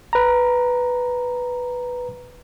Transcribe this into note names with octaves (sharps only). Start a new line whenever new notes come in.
B4 A#5